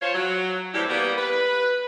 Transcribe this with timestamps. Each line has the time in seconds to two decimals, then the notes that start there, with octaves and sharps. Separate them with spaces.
0.02 F3 F4 C5 C#5
0.14 F#3
0.74 A2 E3 G3 C4 E4 G4
0.89 G3 A#3 B3
1.18 B4